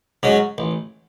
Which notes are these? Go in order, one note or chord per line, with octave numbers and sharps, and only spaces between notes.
G#2 F#3 C#4 F#4
A1